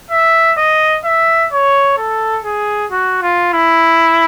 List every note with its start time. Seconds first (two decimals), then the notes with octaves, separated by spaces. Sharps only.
0.11 E5
0.58 D#5
1.05 E5
1.52 C#5
1.97 A4
2.44 G#4
2.91 F#4
3.22 F4
3.53 E4